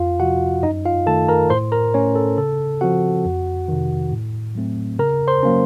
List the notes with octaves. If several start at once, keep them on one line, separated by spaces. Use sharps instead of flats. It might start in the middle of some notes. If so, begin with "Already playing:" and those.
Already playing: F2 F4 F5
C3 F3 F#4 F#5
F#2 D#4 D#5
F4 F5
D#3 A3 A4 A5
A#4 A#5
A2 C5 C6
A#4 A#5
A3 C#4 C#5
A4
C#3 A4
F3 C4 F#4 F#5
F2
C3 D#3
A2
F#3 A3 C4
C#3 A#4 A#5
C5 C6
F#3 A#3 C#4